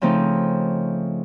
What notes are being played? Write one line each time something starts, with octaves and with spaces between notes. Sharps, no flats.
C#3 F3 A3 C4 D#4